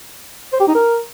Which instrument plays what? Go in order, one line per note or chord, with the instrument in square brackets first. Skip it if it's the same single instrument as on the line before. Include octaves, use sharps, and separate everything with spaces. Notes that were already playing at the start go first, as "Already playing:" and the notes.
[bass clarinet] C5
G4
D#4
A#4